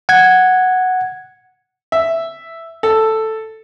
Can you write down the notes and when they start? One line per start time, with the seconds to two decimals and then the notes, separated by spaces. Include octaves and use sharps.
0.09 F#5 G#6
1.92 E5
2.83 A4